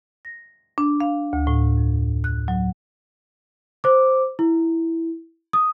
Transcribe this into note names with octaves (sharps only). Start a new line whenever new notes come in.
A#6
D4
F5
D2
A2
F2
F#6
F#3
C5 D6
E4
D#6